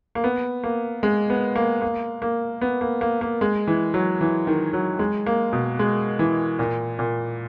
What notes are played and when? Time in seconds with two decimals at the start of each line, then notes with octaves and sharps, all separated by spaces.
0.15 A#3
0.24 B3
0.64 A#3
1.03 G#3
1.30 B3
1.56 A#3
1.82 A#3
2.22 A#3
2.61 B3
2.81 A#3
3.01 A#3
3.21 A#3
3.41 G#3
3.68 E3
3.94 F#3
4.21 E3
4.47 D#3
4.73 F#3
4.99 G#3
5.26 A#3
5.53 B2
5.79 G#3
6.19 E3
6.59 A#2
6.99 A#2